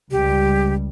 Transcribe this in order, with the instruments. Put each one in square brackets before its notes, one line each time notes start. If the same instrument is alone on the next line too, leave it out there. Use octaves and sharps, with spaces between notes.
[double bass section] C#2 G3 [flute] G4